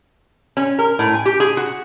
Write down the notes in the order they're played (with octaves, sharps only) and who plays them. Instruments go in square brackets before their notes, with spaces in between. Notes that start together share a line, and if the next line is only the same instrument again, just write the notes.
[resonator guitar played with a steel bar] C#4
A#4
A2
G#5
G4
G#4
F#4